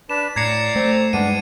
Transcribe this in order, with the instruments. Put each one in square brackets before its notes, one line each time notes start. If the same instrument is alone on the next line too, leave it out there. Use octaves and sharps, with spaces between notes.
[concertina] D4 B4 [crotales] E7
[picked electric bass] A2 [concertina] D5 A#5 [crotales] G#6 C7 C#7
[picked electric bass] A3 [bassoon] C4
[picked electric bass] G2 G#3 [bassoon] B3 [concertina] D4 [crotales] D#7